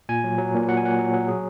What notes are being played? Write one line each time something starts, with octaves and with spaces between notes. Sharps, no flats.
A#2 G#5
F#3
F#3
A#2
F#3 F#5
G#5
A#2 F#5
F#3
F#3
G#4